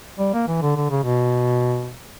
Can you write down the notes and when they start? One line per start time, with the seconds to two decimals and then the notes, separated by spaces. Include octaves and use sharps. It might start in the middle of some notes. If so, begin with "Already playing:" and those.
0.19 G3
0.34 A#3
0.48 E3
0.62 D3
0.76 D3
0.90 C#3
1.03 B2